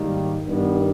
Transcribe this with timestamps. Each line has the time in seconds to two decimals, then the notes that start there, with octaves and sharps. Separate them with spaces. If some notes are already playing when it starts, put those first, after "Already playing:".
Already playing: G#2 D#3 G3 A#3
0.46 G2 D#3 G3 B3